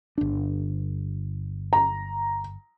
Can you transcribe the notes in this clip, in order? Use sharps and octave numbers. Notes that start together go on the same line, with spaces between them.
G1 D4
A#5